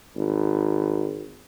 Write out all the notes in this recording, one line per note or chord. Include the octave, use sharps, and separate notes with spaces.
G#1